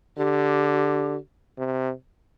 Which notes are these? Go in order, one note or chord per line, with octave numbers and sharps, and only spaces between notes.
D3 G4
C3